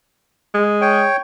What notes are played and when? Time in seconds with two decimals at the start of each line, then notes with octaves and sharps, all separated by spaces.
0.54 G#3
0.81 C#5 G5